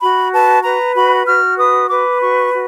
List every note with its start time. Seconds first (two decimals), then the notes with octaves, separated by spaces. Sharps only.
0.01 F#4 B5
0.32 B4 A5
0.64 B4 A#5
0.95 F#4 B5
1.26 F#4 F6
1.58 B4 D#6
1.90 B4 D6
2.21 F#4 C#6
2.52 F#4